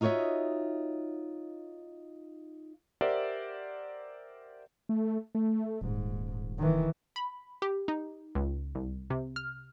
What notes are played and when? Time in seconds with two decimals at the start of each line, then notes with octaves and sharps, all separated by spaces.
0.01 D#4 F4 F#4 C#5 D#5 E5
3.01 G4 A#4 C5 D5 E5 F#5
4.89 A3
5.35 A3
5.82 D#1 G#2
6.58 D#3 E3
7.16 B5
7.62 G4
7.88 D#4
8.35 C#2
8.75 C2
9.10 C3
9.36 F6